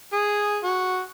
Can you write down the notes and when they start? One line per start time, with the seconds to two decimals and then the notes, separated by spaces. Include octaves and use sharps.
0.12 G#4
0.63 F#4